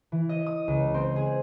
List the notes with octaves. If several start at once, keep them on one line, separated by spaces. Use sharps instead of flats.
E3
D#5
D#6
C#2
C4
G#4